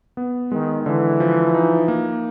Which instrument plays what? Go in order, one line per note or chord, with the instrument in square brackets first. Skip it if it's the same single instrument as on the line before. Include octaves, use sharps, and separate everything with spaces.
[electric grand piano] B3
[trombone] D#3 [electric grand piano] G#3
[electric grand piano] D3 [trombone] E3
[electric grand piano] F3
D#4
A#3